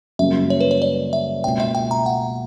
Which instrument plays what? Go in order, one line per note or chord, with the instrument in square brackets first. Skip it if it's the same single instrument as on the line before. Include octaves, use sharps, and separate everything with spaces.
[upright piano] F#2 C#3 G3 A#3 [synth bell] E5
[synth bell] C#5
B4
C#5
D5
E5
[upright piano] C#2 B2 A#3 [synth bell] G5
[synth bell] E5
G5
A#5
F#5